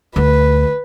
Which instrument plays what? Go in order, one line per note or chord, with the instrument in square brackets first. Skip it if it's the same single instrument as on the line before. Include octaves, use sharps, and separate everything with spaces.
[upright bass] D2 [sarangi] B4